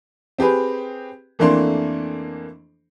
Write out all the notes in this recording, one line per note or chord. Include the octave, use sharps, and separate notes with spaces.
C4 G4 G#4 B4
F2 E3 A3 A#3 D4 C6